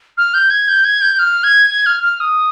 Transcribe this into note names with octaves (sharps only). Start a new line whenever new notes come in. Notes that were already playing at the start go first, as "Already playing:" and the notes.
F6
G6
G#6
G6
G#6
G6
F6
G#6
G#6
F6
F6
D#6